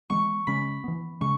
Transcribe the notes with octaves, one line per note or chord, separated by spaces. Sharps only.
E3 G#3 B3 C#6
C#3 G#3 C#4 B5
E3 B3
C#3 G#3 C#4 C#6